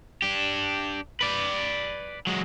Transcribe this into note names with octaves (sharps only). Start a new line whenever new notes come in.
D4 G4
B4 D5
F#3 G#3